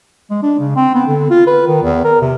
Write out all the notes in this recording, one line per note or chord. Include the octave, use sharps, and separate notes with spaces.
G#3
D4
C#3
C4
B3
D3
F4
B4
D#3
E2
A#4
C3